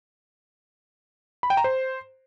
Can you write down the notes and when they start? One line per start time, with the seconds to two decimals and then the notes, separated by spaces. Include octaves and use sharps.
1.43 B5
1.50 G5
1.57 A#5
1.64 C5